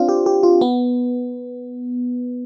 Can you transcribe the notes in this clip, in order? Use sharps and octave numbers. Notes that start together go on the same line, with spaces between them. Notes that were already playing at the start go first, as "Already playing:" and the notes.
Already playing: C4 D4 F4
G4
G4
F4
B3